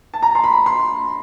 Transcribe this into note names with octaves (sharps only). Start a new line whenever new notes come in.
A5
A#5
C6
B5
C6